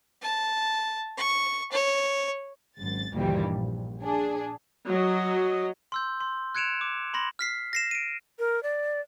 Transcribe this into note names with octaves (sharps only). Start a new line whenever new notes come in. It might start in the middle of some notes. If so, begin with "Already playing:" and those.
A5
C#6
C#5
G#1 F#2 A6
D2 G2 A#2 D#3 E3 G3
A#1
D4 G#4
F#3 D#5
C6 E6 G6
C6
F#6 G#6 C#7 D7 E7 F7
D6
B5 C6 A#6 F#7
F6 B6 C7
A#6 C7 E7
D7 D#7
A#4
D5